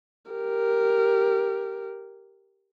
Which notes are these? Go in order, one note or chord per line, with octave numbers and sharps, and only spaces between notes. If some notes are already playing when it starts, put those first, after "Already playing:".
G4 A#4